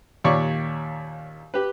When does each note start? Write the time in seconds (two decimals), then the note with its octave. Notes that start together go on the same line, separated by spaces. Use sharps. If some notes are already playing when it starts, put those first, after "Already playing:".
0.24 D#2 A#2 G4 C#5 D5 C#6
1.54 G4 B4